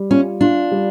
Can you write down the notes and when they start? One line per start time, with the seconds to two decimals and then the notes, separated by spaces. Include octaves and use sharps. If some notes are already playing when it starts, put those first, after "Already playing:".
Already playing: G3
0.11 C#4 F4
0.41 D4 F4
0.72 G3